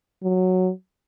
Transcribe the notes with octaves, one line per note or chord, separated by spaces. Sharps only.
F#3